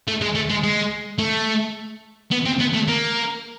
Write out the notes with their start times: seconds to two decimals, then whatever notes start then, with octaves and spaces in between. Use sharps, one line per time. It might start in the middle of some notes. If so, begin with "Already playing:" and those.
0.07 A3
0.21 G#3
0.35 A3
0.50 G#3
0.63 G#3
1.18 A3
2.31 B3
2.45 C4
2.59 B3
2.73 A3
2.88 A#3